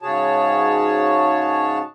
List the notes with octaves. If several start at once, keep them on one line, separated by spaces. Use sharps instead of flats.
G#2 C#3 F#4 G#4 C#5 A5